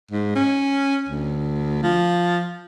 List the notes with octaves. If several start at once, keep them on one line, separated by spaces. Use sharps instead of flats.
G#2
C#4
D2
F3